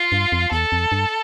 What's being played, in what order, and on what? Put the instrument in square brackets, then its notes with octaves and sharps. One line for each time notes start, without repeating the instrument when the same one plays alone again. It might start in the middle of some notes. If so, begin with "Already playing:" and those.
Already playing: [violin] F4
[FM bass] G2
F2
[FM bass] E2 [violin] A4
[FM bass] F2
G2